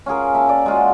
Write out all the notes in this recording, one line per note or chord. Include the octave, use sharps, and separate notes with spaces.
C#4 F4 G#4 A#4
A#3 E5 A5
D5
G#3 F4 F#4